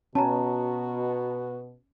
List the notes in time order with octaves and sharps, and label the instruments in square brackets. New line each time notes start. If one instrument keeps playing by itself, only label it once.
[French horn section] B2 [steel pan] C#4 [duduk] F#4 [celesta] A5 A#5